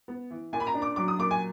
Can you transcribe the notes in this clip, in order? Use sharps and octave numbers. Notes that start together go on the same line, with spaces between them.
B3
E3
A#2 G#5
B5
A#5
D4
D6
F#3 D6
D#6
A#2 D6
G#5